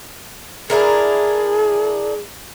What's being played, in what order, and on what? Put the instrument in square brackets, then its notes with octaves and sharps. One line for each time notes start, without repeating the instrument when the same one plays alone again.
[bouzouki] D4 E4 A#4 [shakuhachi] G#4